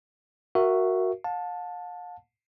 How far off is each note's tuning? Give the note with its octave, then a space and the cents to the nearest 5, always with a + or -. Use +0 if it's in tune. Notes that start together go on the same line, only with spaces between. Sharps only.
F#4 +0 A#4 -5 E5 +15
F5 +45 A5 +0